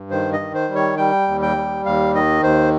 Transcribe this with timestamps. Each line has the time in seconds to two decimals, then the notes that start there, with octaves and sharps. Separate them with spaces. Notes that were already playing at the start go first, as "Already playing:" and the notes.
Already playing: G2
0.10 D#3 C5
0.33 D#5
0.39 D#3
0.54 C5
0.69 G3
0.75 C#5
0.97 G3 G5
1.28 D#2
1.42 G5
1.56 G3
1.85 D#2 F5
2.14 D#3 D#5
2.43 D#2 C5